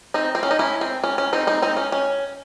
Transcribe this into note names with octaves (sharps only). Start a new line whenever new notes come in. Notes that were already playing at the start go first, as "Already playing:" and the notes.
C4 D#4
C4
C#4
D#4
C#4 E4
C4
C#4
C#4
C4 D#4
C4 D#4
C4 D#4
C#4
C#4